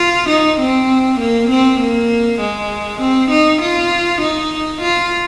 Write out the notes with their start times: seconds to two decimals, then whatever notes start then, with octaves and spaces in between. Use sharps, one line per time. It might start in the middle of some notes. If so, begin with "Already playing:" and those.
Already playing: F4
0.29 D#4
0.59 C4
1.20 A#3
1.50 C4
1.80 A#3
2.41 G#3
3.01 C4
3.31 D#4
3.62 F4
4.21 D#4
4.82 F4